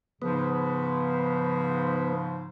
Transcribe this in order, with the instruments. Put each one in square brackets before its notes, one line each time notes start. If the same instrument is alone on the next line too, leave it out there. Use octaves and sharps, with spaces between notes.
[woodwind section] G#2 C#3 F3 [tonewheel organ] B3